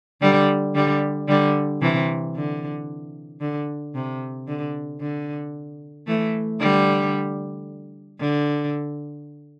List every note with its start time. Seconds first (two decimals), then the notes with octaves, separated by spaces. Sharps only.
0.22 D3 G3
0.75 D3 G3
1.29 D3 G3
1.82 C3 E3
2.35 D3
3.41 D3
3.95 C3
4.48 D3
5.01 D3
6.07 E3 A3
6.60 D3 G3
8.20 D3